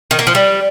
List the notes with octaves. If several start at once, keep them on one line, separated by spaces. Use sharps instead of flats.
D#3
A#3
F3
G3